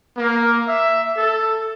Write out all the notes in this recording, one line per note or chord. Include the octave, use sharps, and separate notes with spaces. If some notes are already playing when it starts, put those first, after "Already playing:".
A#3
E5
A4